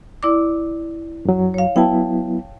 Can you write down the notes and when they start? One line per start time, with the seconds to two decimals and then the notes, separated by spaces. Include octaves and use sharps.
0.23 E4 D5 D6
1.25 F#2 F#3
1.54 C#5 F5
1.76 F#3 B3 E4 G5 A5